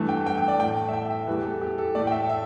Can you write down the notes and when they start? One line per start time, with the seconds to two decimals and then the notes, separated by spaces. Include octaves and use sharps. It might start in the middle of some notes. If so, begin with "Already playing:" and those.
Already playing: G2 E3 A3
0.09 G5
0.26 G5
0.37 G5
0.48 D5
0.60 A2 A3 G5
0.89 E5
0.94 G5
1.10 E5
1.27 E2 E3 G3 B4
1.45 A4
1.61 G4
1.78 A4
1.95 A2 A3 D5
2.07 G5
2.12 E5
2.29 E5